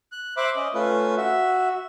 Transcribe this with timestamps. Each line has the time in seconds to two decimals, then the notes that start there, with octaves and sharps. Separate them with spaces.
0.12 F#6
0.37 C5 E5 B5 D6 F#6
0.56 C#4 D#5
0.74 A3 C#4 F4 B4
1.17 F#4 E5